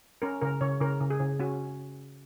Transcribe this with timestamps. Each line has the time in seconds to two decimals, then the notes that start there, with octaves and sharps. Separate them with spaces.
0.22 C#4 A#4
0.42 C#3 A#4
0.61 C#3 C#5
0.80 C#3 A#4
1.00 C#3
1.10 G#4
1.20 C#3
1.40 C#4 F#4